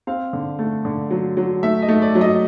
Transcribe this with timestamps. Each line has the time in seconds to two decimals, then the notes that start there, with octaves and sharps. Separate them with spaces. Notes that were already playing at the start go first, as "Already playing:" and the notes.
0.07 C4 F5
0.33 D3
0.59 A3
0.85 D3
1.11 F#3
1.37 F#3
1.63 A3 E5
1.82 D#5
1.88 A3
2.02 D5
2.15 F#3
2.21 D#5